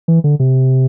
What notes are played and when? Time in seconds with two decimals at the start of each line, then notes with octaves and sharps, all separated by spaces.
0.08 E3
0.24 D3
0.40 C3